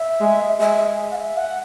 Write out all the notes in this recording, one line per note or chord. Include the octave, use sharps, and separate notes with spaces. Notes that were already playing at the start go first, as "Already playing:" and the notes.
Already playing: E5
G#3
G#3 E5
F#5
E5
F#5